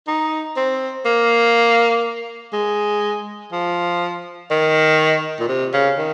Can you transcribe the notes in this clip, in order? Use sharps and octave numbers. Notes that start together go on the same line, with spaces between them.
D#4
C4
A#3
G#3
F3
D#3
A#2
C3
C#3
D#3